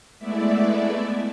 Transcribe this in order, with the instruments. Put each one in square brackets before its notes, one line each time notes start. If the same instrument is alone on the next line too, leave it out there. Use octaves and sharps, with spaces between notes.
[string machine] G#3 A3 B3 E4 D5 E5